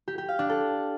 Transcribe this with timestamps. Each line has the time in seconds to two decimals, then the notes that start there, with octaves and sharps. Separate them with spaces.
0.08 G4
0.18 G4
0.28 F5
0.39 D4
0.49 A4